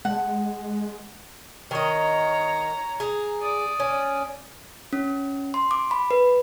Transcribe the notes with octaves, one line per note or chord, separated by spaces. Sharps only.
G#3 F#5
D#3 C#5 D#5 A#5
G#4 A#5
D5 D#6
C#4
C#4
C6
D6
B5
B4